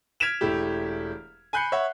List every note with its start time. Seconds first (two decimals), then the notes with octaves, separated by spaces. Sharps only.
0.20 F6 G#6 B6 D7 E7 F7
0.41 E1 A3 E4 G4
1.53 G#5 B5 F#6 G6 C7 C#7
1.72 C#5 E5 F#5